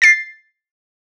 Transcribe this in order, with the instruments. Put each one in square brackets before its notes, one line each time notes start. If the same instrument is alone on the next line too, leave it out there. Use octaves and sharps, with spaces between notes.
[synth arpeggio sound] A6 C7